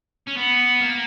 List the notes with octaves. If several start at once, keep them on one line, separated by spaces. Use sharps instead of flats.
C#4
B3
A#3